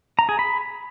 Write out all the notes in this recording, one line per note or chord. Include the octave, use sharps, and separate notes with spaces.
A#5
G#4
B5